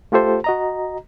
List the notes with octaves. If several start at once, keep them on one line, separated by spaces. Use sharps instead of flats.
A3 F4 G4 A4 C5
F#4 D#5 A#5